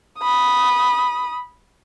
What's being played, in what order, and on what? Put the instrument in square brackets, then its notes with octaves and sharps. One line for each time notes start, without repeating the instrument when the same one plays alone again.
[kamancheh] B5 D#6